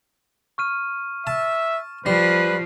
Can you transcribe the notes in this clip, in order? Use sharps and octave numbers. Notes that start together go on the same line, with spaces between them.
C#6 F6 D#7
E5 A5
F3 G3 B4 C7